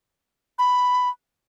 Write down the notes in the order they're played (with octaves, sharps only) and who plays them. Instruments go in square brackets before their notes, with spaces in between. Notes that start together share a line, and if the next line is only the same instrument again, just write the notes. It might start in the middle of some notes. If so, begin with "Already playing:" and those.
[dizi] B5